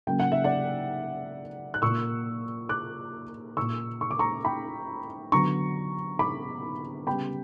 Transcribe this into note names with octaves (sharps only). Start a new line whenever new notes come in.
C#3 F#3 A#3 G5
F#5
E5
D5 F#5
F#6
A#2 A#3 C#6 E6
D6 F#6
A#2 A#3 C#6 E6
C#6
D6
A#5 C#6
G5 B5
D3 F#3 B3 A#5 C#6
B5 D6
C#3 G3 B3 G5 B5